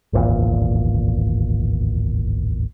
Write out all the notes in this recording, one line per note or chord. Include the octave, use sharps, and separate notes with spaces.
D1 G#1 E2 A#2